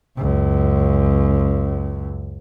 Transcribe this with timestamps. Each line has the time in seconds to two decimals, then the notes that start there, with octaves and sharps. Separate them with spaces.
0.18 C#2 F#2